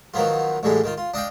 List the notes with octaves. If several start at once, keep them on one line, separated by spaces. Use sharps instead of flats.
D#3 F3 F#3 B3 F4
A1 A2 D3 G3 G#3
D#3 F4
F4
D4 D#5 F5 G5